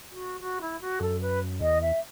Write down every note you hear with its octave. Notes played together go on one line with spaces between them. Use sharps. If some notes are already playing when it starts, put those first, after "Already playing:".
F#4
F#4
E4
F#4
F#2 A4
B4
E2 D#5
E5